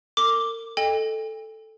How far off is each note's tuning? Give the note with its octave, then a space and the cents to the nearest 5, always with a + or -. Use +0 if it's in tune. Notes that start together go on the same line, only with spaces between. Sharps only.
A#4 -40 D6 +0
A4 +0 D#5 +5 G5 +40